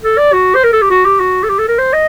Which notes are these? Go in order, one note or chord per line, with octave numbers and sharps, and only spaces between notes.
A4
D5
F#4
C5
A#4
A4
G4
F#4
G4
F#4
A4
G4
A4
A#4
C5
D#5